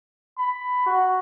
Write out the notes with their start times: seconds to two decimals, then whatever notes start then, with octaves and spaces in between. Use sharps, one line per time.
0.38 B5
0.86 F#4